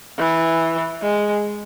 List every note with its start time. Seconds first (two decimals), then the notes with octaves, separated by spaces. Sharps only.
0.19 E3
1.02 G#3